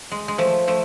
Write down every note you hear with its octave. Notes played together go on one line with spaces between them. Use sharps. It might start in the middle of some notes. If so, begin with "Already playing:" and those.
G#3
G#3
F3 A3
F3 A3